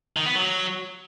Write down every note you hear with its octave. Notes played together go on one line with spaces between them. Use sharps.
D#3
B3
F#3